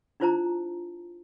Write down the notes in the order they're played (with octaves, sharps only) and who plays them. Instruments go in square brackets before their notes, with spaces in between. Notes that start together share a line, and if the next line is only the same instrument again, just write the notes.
[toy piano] D4 E4 F4 C5 A5 A#5